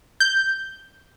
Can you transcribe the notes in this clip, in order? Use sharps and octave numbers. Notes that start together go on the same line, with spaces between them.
G6